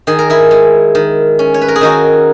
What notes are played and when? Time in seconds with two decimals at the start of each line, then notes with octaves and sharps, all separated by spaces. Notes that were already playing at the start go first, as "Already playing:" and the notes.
0.07 D#3 G#4
0.19 A#4
0.30 E4 G#4
0.51 G#3
0.95 D#3
1.39 C#4
1.54 C#5
1.61 B4
1.68 A#4
1.76 G#4
1.81 D#3 D#4 F#4